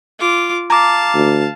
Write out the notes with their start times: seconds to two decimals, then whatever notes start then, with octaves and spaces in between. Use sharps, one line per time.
0.19 F4 D6
0.70 F5 A5 A#5 D6
1.15 D2